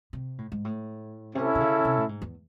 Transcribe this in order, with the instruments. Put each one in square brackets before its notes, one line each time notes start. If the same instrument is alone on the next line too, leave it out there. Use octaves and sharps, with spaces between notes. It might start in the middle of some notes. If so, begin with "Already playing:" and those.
[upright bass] C3
A2
G#2
A2
[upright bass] C3 [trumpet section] C#4 E4 A4
[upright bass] C3
C#3
C3
A2
G#2
E2